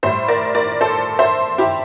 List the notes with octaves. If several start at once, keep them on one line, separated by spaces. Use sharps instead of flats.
A2 G3 C5 E5
A#4 D5
A#4 D5
A4 C5
C5 E5
E4 G4